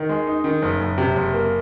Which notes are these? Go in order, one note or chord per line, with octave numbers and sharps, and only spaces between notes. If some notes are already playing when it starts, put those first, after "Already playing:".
Already playing: D#3
G#3
D#4
D#3
F#1
F#1
C3
F#1
A#3